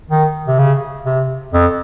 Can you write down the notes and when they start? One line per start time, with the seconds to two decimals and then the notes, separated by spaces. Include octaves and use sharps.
0.10 D#3
0.48 C3
0.59 C#3
1.06 C3
1.53 F2